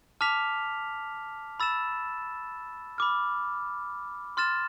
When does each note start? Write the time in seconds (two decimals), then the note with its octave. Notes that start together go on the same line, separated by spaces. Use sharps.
0.21 A5 D6 F6 B6 F7
1.60 B5 E6 A6 E7
2.98 B5 D6 F6
4.37 C6 F6 A6 E7